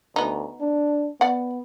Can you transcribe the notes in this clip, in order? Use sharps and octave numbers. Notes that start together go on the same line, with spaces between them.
D2 B3 D#4
D4
B3 D5 F#5